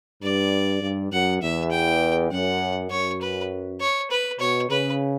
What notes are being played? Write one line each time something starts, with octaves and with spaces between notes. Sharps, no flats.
G2 D5
G2
F#2 F#5
E2 E5
G5
F#2 F#5
F#2 C#5
B4
C#5
B4
B2 C#5
C#3 B4